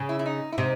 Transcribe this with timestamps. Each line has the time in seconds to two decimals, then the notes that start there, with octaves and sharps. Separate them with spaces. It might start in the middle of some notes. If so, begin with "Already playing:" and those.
Already playing: C#3
0.09 E4
0.19 E4
0.26 D#4
0.52 E4
0.58 C3 D#4